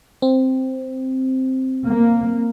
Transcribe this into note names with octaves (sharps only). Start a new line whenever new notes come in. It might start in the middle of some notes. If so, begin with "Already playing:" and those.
C4
A#3